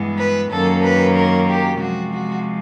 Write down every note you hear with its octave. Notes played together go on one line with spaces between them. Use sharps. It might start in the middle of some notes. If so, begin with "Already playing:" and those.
Already playing: G2 E3 G#3 B3
B4
F#2 D#3 F#3 A#3 C#4 A4
B4
A#4
G4
C3 F3 G#3 F#4
F#4